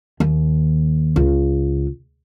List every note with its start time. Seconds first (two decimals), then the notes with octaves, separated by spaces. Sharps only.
0.20 D#2
1.16 C#2